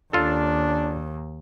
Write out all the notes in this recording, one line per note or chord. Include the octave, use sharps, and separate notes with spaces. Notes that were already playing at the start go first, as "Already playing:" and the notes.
D#2 C#4 D4 F4 A4